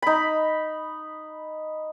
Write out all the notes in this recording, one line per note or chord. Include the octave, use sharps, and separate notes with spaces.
D#4 B5